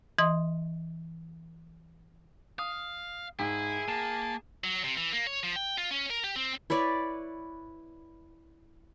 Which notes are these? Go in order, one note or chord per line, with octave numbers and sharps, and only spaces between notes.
E3 D#5 C6 D#6
F5 D#6
G#2 E4 G#4
A#3 A5 E7
F#3
C3
E3
A#3
C#5
F3
G5
F4
C#4
A#4
G4
C4
E4 B4 C#5 D5